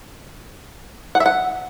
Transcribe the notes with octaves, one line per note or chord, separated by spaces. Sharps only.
F#5
E5
F#5